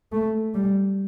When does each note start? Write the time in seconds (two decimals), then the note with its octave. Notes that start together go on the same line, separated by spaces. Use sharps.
0.12 A3
0.54 G3